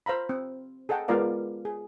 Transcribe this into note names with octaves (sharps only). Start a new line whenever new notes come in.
C5 F5 A#5 B5
C4
G#4 A4 D#5 F#5 G5
G#3 B3 F4 A#4 D5 F5
G#4